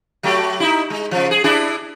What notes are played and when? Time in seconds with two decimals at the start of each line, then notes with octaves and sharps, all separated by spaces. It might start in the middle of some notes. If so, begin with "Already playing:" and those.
0.23 F#3 A3 G4
0.60 D#4 E4
0.90 G#3
1.11 C#3 F3
1.31 G#4
1.44 D4 E4 G#4